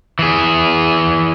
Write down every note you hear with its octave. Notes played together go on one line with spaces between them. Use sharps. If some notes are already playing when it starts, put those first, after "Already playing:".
E3 G#4